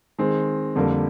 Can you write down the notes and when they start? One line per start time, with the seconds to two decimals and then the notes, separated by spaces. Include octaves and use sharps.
0.19 D#3 G#3 C4
0.76 F2 D3 G3 A#3